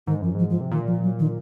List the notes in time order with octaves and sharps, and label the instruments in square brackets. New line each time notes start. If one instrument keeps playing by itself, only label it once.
[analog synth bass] G#2 [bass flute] D#3
[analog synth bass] F#2 [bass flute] F3
[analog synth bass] G#2 [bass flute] F3
[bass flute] F3
[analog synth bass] C3
[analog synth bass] A#2 [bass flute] D#3
[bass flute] F3
F#3
D#3